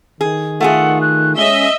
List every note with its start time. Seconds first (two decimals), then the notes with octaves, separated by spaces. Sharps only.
0.21 D#3 G#4
0.60 A3 F4 G#4 F#5
1.02 F#6
1.37 G#3 C#4 D#5 E5 G7